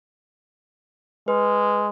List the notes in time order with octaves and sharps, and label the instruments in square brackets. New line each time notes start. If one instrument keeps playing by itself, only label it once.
[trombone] G#3 [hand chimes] B4